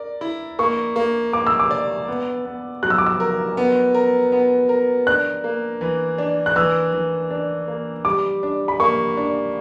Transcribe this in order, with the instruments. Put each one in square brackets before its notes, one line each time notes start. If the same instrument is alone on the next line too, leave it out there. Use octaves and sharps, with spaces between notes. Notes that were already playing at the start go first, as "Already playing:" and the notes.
Already playing: [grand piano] A#4 D5
E4
[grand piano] A#3 [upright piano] C#6
[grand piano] A#3
[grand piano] A#3 [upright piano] D6
[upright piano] E6
D6
[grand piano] D5
B3
B3
[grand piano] F#3 [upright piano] F#6
[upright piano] E6
D6
E6
[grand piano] A#4
B3
A#4
B3
A#4
[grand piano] D4 [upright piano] F#6
[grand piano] A#3
E3
D4
[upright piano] F#6
[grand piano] E3 [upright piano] E6
[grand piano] E3
D4
A#3
[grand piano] G3 [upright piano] D6
[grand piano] D4
[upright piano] B5
[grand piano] A#3 [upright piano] C#6
[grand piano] D4